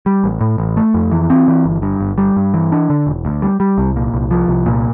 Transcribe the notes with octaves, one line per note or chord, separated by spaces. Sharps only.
G3
A1
A2
A1
A3
F2
E3
C4
E3
G1
G2
G1
G3
G2
E3
D4
D3
E1
D2
G3
G3
C2
A#2
C2
F3
C2
A#2